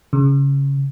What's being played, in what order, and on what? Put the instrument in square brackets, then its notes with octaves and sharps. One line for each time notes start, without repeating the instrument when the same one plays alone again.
[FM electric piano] C#3